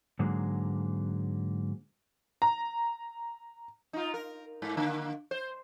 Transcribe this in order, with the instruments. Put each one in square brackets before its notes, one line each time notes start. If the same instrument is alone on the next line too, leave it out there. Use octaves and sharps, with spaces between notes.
[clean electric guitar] G#2 D3 F#3 G#3 A#3
[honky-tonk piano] A#5
[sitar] D#4 F4
A#4
G#2
D3 A#3
C5